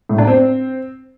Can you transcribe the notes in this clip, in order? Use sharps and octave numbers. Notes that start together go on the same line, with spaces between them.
A2
D4
C4